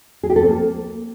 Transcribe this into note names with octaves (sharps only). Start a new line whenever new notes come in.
G#4
G4
A4
C4
A#3